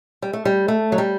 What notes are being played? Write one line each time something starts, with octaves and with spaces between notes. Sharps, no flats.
G3
A3
G3
A3
F#3
G3